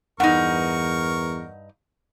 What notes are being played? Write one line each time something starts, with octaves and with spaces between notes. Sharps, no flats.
E2 G2 D#4 A#4 F#5 C#6